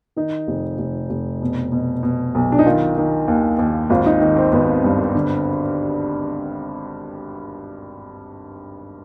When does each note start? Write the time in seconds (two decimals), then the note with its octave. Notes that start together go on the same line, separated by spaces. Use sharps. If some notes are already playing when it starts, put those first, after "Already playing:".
0.16 D#3 D#4
0.48 F1
0.78 F1
1.10 F1
1.42 B2
1.72 B2
2.03 B2
2.35 B1
2.52 D4
2.59 D#4
2.66 D#3 F4
2.97 D#3
3.28 D#2
3.59 D#2
3.90 G#1 F4
4.06 D#4
4.21 D#3
4.36 C4
4.52 G#1 B3
4.84 G2
5.15 D3